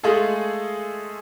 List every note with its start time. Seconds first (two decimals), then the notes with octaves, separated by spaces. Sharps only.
0.03 G#3 A3 F4 G#4 A4